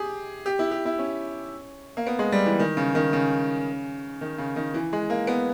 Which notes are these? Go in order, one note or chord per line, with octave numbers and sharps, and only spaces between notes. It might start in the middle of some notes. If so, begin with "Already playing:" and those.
Already playing: G4 G#4
G4
E4
G4
E4
C#4
A#3
B3
G#3
G3
E3
D#3
C#3
D#3
C#3
D#3
C#3
D#3
E3
G#3
A#3
B3